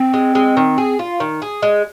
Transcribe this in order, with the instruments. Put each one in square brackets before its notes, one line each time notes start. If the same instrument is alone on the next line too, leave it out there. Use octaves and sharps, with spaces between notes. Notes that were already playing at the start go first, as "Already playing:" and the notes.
Already playing: [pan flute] C4
[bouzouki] G#3
G#3
D#3
G#4
F4
D#3
G#4
G#3